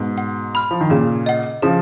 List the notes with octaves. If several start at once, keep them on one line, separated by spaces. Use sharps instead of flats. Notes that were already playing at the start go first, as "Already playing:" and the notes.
Already playing: G#2 B2
F#5
B5 F6
F3
D#3
A#2 C#3 G#4
D#5 F#5
C#3 F3 G#4